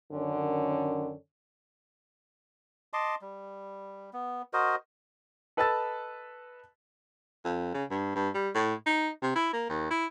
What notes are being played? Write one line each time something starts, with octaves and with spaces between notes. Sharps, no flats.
F#2 D3 D#3 C#4
D#5 A5 C6 D6
G3
B3
F#4 A#4 C5 D#5
A4 B4 D#5 A5 E6 A6
F2
C#3
G2
G2
G3
A2
D#4
C3
E4
A#3
D#2
E4